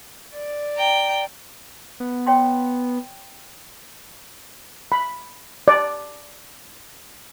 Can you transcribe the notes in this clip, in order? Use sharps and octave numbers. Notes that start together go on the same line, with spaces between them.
D5
G5 A#5
B3
C#5 G5 C6
B5
D5